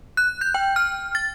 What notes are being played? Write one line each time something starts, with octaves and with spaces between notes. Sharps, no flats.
F#6
G6
G5
F6
A6